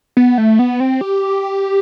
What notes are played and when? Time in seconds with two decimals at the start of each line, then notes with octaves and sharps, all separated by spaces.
0.17 B3
0.38 A3
0.59 B3
0.80 C4
1.01 G4